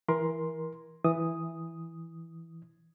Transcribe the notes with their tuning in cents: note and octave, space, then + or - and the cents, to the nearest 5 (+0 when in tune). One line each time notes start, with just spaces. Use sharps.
E3 +0 A#4 +25 C6 +0
E3 +0 D#6 +0